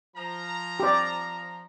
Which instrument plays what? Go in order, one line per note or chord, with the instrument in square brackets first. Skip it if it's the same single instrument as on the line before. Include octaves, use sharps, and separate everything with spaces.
[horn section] F3 A#5
[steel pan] G4 D5